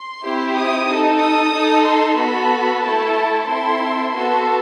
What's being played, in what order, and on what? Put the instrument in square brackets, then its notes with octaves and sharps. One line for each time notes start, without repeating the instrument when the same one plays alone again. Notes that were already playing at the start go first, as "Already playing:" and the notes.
Already playing: [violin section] C6
C4 E4 G4
D#6
D#4 A4
D#6
D#4 A4
C6
B3 F#4 A4 B5
A3 E4 A4 A5
C4 E4 A4 C6
B3 F#4 A4 C6